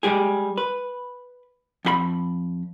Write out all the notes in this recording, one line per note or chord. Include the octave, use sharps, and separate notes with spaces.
G3 G#3 G4 G#4
B4
F2 G4 B5